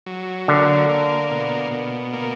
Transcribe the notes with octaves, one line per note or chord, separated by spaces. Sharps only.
F#3
D3 A#3
A#3
B2
B2
A#3